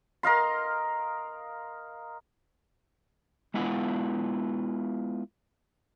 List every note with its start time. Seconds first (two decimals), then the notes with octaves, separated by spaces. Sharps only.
0.23 A#4 D#5 F5 C6
3.54 G#3 B3 E4 F4 F#5